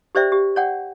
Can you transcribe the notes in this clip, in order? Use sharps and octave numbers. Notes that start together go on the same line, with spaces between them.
G4 C5 D5 E5 G5
G4
C#5 D5 F#5 G5